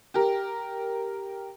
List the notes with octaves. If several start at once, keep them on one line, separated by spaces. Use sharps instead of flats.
G4 A#4